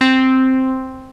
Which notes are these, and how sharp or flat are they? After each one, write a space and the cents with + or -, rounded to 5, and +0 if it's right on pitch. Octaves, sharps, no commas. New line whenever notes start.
C4 +0